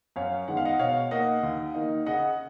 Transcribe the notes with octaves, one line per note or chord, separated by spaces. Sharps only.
F#2 C#5 F5
D#3 G#3 B3 F#5
F5
D#5 F#5
B2 C#5 F5
A#3 D#4 D#5 F#5
D#2
D#3 A#3 D#4
C#3 D#5 F#5